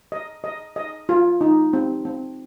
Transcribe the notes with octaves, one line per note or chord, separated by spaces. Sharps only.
D#5
D#5
D#5
F4
D#4
C4
C4